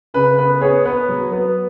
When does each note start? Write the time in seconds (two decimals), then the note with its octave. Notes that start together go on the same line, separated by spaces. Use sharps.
0.14 C#3 B4
0.38 B3 B4
0.61 B3 G#4 C#5
0.85 B3 B4
1.09 F#3
1.32 B3